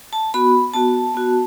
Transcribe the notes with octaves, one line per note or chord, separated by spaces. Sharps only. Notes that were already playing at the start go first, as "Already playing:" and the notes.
A5
B3 F#4 B5
B3 F#4 A5
B3 F#4